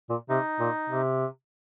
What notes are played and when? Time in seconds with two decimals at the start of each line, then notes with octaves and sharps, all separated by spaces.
0.10 A#2
0.29 C3 D#4
0.60 A#2
0.90 C3